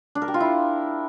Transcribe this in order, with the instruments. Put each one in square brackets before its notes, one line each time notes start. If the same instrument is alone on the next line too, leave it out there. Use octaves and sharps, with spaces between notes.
[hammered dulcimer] D4
A#4
G4
F4
E4